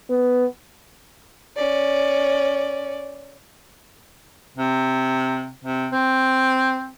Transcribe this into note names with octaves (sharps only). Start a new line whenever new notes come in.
B3
C#4 D5
C3
C3
C4